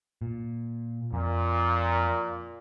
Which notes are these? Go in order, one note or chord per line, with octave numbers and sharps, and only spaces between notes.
A#2
F2 A#2